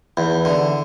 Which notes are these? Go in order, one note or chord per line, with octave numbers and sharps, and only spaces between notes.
E2
D3